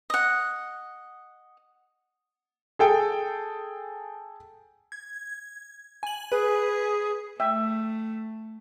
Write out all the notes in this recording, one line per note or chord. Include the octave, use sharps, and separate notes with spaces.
D#5 F#5
G#4 A4 G5
G#6
G#5 F#7
G#4 B4
A3 E5 G5